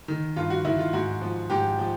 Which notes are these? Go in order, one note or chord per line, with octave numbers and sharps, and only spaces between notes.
D#3
G2 F4
F#4
D#3 E4
F4
G#2 F#4
F3
G#2 G4
F3